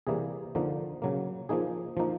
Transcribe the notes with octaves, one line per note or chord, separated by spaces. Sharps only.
C3 E3 G3 A#3 G#4
D3 F3 A#3 D#4
C#3 F#3 A#3
F3 A#3 D#4 G#4
F3 A#3 D#4